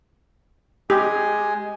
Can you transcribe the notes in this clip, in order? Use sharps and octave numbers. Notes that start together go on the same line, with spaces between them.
G#3 G4 G#5